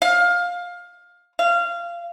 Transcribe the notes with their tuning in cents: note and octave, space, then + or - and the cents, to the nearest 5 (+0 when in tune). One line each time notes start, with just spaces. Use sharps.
F5 +15
F5 -20